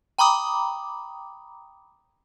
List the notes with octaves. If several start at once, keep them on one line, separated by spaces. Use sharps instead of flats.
G5 A#5 B5 D6 D#6